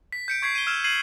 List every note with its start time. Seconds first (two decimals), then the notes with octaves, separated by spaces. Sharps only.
0.12 B6
0.28 G6 C#7 D7
0.42 C#6 G#6 B6 C7
0.55 D#7 G7
0.67 E6 F6 G#6 E7
0.84 G#6 C7 D#7 F#7